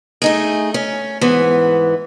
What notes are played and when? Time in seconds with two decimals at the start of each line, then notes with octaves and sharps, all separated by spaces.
0.22 A3 D#4 G#4
0.74 C#4
1.21 G#2 E3 B3